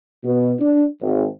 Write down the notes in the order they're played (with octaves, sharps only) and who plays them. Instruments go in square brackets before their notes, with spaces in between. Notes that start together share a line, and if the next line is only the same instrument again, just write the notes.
[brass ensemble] B2
D4
G#1